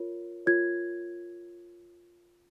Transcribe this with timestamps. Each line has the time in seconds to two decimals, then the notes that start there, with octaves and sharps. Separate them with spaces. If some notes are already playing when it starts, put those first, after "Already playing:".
Already playing: F4 A#4 C#5
0.46 F4 A#4 C#5 G#6